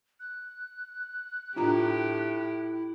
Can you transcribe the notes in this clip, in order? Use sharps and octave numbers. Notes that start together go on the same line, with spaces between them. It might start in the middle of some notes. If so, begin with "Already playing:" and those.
F#6
A2 D4 E4 F4 G4 A#5